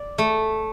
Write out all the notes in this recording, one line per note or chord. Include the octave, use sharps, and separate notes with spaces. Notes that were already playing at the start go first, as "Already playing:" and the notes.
Already playing: D5
A3